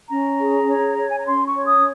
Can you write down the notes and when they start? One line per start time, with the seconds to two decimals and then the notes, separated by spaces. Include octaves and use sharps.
0.10 C#4 A#5
0.39 G#4
0.69 C#5
0.98 C#5
1.11 G#5
1.19 A#5
1.26 C#4 C6
1.46 C#6
1.56 C#5
1.66 D#6